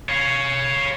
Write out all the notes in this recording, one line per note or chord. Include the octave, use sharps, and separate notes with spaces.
C#5 F5